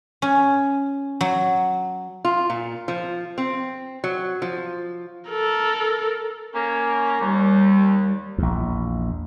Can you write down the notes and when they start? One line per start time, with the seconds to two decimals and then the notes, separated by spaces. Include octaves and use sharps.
0.22 C#4
1.21 F#3
2.25 F4
2.50 A#2
2.88 F3
3.38 C4
4.04 F#3
4.42 F3
5.30 A4 A#4
6.54 A#3 C#4
7.21 D#2 G3
8.38 A#1 E2